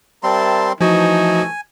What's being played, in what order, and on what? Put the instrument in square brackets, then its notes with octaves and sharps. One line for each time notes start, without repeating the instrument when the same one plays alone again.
[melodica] G3 C4 C6 [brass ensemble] A#4 E5 A5
[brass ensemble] E3 A3 [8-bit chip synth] F3 F#4 [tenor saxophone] D#4 [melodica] G#5